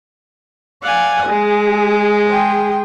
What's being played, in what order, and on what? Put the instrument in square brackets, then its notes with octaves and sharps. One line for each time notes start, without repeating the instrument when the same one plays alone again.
[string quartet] D5 G#5 [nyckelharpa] F5 F#5
[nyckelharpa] G#3 [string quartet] G#4
[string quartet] G#4 G5 C6